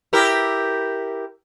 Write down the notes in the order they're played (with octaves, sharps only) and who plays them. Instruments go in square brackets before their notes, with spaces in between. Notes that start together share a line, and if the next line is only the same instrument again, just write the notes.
[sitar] E4 G4 A#4